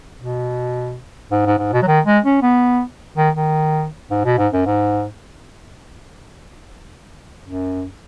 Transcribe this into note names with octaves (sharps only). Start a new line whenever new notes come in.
B2
G#2
G#2
G#2
B2
F#3
D#3
G#3
C#4
B3
D#3
D#3
G#2
B2
G#2
F#2
G#2
F#2